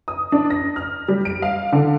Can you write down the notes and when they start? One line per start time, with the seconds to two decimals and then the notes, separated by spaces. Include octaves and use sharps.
0.08 D#6
0.32 D4
0.50 A#6
0.76 F6
1.08 G3
1.25 D7
1.42 F5
1.72 D3